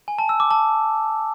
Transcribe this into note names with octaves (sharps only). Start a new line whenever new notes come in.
G#5
A5
E6
D6
A5